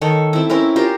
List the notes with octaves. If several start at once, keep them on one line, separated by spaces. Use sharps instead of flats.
D#3 A4 C#5
C4 E4
C4 C#4 E4 A#4
F4 G4 A#4 C5